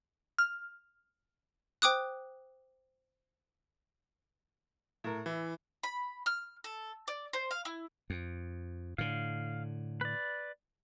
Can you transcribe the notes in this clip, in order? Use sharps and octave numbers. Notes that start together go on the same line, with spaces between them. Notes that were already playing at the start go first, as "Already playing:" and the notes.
F6
C5 G5 D6 D#6 F#6
A2 A#4
E3 E4
B5
F6
A4
D5
C5
F5
E4
F2
A2 D3 F5
B4 D5